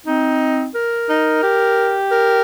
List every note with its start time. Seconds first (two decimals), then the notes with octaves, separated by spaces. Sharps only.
0.06 C4 D#4
0.75 A#4
1.09 D#4
1.43 G4
2.12 A#4